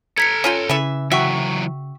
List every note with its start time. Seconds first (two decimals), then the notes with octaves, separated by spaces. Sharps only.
0.18 A4 A#5 G#6 B6 C#7
0.44 C#4 F4 G5
0.69 C#3 E3 E5
1.11 E3 F#3 F#4 E5 G5 C#6